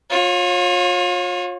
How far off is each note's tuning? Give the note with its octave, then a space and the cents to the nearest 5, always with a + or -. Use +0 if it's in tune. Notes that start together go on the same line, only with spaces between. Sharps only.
F4 +35 C#5 -25